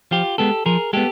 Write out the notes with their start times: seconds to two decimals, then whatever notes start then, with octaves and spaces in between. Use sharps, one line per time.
0.11 F3 F4 G4
0.38 G#3 B3 G4 A4
0.66 F3 G#4 A#4
0.93 G#3 B3 G4 A4